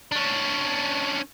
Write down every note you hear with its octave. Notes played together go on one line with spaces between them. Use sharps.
C#4 D4